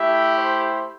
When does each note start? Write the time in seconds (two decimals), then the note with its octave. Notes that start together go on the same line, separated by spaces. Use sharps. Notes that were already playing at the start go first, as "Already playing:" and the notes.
Already playing: A3 E4 G4 E5
0.36 C5